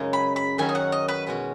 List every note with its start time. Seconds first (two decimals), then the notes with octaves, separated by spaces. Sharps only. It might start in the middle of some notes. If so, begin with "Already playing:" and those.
Already playing: F#2 C#3 G#3 D#4 G#4
0.13 B5
0.36 B5
0.58 D#3 F#3 C#4 F#4 G#5
0.69 D#5
0.75 F#5
0.92 D#5
1.08 B4
1.27 B2 G#3 C#4 F#4